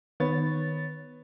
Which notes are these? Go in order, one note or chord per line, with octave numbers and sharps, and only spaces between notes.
D#3 B3 C#5 A6